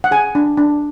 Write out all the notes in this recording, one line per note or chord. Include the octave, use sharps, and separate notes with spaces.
F#5
G#4 G#5
D4
D4